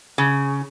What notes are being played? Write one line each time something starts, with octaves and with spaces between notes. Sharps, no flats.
C#3